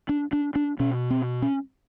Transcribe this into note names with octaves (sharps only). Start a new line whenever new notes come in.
D4
D4
D4
B2 C#4
C4
C#4